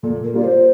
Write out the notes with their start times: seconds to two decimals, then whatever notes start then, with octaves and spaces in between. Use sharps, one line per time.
0.03 A#2 A4
0.24 A#4
0.34 G3 A#3 F4 D5
0.44 C5